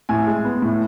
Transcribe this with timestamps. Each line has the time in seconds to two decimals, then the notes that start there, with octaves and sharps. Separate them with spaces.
0.09 A2 G#5
0.27 G#3
0.44 B3
0.62 A2